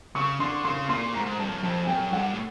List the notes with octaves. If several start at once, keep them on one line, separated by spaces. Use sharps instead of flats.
C#3 C#6
D3 C6
C#3 C6
A#2 C6
G#2 A#5
G#2
G2 A5
F#2
F2 A5
G#5
F#2 G5
G2 F#5
A2